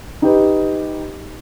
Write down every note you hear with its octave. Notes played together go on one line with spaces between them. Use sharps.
D#4 G4 B4